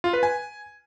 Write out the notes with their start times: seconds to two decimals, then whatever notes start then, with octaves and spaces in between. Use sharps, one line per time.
0.04 F4
0.13 B4
0.23 G#5